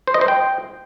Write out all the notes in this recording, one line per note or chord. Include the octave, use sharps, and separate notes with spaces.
C5
D#5
C5
G5